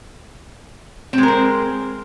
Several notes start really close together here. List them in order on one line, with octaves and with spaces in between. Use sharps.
C4 G#3 A#4 C5